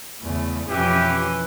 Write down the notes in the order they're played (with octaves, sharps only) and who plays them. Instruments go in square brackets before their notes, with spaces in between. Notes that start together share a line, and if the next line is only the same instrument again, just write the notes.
[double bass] E2 C#3 [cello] A3
[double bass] F2 B2 [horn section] E3 [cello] F3 C#4 [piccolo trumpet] G4